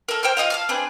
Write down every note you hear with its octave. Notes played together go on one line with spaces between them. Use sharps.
A4 A#4
C5 G5 A#5 F6
F4 A4 D#5 F5
F5 A5 F6
C4 D4 G#4 B4